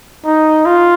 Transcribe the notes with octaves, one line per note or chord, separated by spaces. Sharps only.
D#4
F4